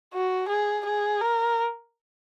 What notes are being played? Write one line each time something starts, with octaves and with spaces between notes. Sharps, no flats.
F#4
G#4
G#4
A#4